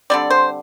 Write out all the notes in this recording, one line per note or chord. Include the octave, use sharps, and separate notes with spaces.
D3 G3 C4 D5
C5